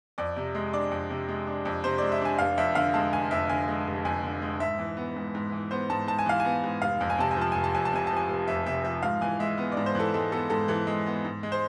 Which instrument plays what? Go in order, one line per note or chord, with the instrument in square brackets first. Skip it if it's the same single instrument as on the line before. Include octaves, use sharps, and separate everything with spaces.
[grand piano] F2 D5
C3
G#3
D4 D5
F2
C3
G#3
D4
F2
C3 C5
G#3 D5
E5
D4 G#5
F1 F5
F2 E5
D3 F5
G#3 A5
F1 G#5
F2 E5
D3 G#5
G#3
F1
F2 G#5
D3
G#3
G#2 E5
E3
B3
G#2
G#2
E3
B3 C5
G#2 A5
G#2 A5
G#5
E3 F5
B3 G#5
G#2
F1 F5
F2
G#5
C3 A5
G#5
F3
A5
F1 G#5
A5
F2 G#5
A5
C3 G#5
F3 A5
G#5
F1
F2 E5
C3 E5
F3 E5
G#2 F5
E3 G#5
G#3 E5
B3
D5
G#2
C5
E3 A4
G#3 A4
B3 A4
G#2 A4
E3 A4
G#3
B3
G#2
G#3
C5